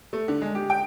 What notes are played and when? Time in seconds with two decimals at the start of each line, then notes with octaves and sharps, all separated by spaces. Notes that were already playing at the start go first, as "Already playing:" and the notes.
0.13 A3
0.28 D3
0.42 G#3
0.55 G4
0.70 G5